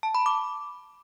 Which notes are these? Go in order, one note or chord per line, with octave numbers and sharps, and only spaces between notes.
A5
B5
D6